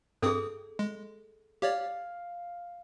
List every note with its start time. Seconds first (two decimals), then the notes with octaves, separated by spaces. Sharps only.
0.22 G2 C4 G#4 A4 D#6
0.79 G#3
1.62 G4 C#5 D5 F5